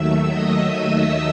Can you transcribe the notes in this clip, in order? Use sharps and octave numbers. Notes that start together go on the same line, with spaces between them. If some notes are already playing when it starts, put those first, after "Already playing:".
Already playing: D#2 D#3 F#3 A3 E5 E6
D#5 D#6
E5 E6